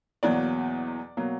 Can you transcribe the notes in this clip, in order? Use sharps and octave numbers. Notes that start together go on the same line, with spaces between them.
E2 B2 F#3 A#3 D5
B2 F#3 A#3